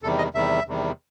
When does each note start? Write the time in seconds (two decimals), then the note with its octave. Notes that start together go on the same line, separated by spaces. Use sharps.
0.03 E2 C3 D#3 G3 A4
0.18 D#5
0.34 E2 C3 D#3 G3 E5
0.66 E2 C3 D#3 G3